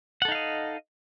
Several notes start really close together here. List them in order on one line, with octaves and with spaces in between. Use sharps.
F#5 A4 D#4 F5 D#5